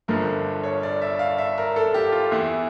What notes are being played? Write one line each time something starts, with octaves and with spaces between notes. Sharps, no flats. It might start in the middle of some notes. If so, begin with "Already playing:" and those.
G1 G2 D3 F3 A#4
C#5
D5
E5
F5
E5
A#4
A4
G4
F4
E2 E3 E4